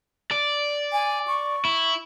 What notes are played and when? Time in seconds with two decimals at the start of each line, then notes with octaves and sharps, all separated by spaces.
0.31 D5
0.93 G#5
1.27 C#6
1.65 E4